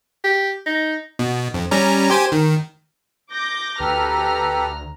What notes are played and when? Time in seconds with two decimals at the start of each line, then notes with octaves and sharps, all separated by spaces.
0.24 G4
0.66 D#4
1.19 B2
1.54 F2
1.71 G3 C#4 A#5
2.10 G4 C5 G#5
2.32 D#3
3.31 D6 G6 A#6
3.80 D2 G4 A4 B4 A#5 F6